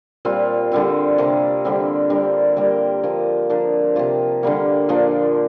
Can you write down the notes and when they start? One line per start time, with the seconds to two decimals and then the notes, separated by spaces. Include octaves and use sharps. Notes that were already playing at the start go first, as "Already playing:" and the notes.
0.25 A#2 G3 C4 F4
0.72 D3 G3 C4 F4
1.18 C3 A#3 D4 A#4
1.65 D3 G3 C4
2.10 G3 D4 A#4
2.57 G3 A#3 G4 A#4
3.03 F3 A#3 F4
3.50 F3 D4 A#4
3.96 C3 A#3 F4
4.43 D3 G3 A#3
4.89 A#2 F3 A#3 D4